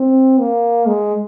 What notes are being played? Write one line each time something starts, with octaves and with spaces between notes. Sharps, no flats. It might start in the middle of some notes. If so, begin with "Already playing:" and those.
Already playing: C4
A#3
G#3